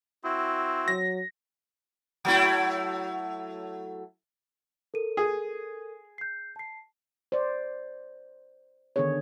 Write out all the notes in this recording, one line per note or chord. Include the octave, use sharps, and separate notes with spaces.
C4 E4 F#4
F#3 A#6
F#3 A3 E4
A4 A#4 D#7
G#4
G6 C7
A5 C7
C5 D5
D3 D#3 B3 D4 G#4 C#5